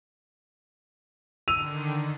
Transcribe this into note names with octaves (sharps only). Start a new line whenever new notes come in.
D3 D#3 E6 D#7 F7